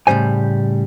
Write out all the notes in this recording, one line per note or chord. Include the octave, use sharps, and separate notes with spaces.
A2 C#3 G3 C5 G#5